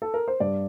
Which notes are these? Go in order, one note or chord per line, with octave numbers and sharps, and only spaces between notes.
A4
A#4
C5
G2 D5